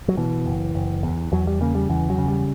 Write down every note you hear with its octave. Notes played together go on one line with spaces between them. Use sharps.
F#3
B2 E3
F#1
F#1
E2
E2 F#3
G3
C#3 A#3
G3
E2 E3
F#3
C#3
G3